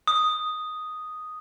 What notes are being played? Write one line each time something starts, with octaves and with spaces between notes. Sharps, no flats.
D#6